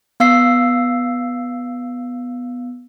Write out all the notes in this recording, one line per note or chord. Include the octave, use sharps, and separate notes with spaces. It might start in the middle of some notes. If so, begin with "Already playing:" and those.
B3 F5 E6 C7